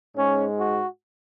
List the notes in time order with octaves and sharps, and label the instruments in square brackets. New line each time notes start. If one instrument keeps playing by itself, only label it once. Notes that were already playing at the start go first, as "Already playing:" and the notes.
[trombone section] G#2 G#3 C#4
F#4